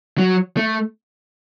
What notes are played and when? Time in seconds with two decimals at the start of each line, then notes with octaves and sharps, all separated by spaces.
0.18 F#3
0.57 A3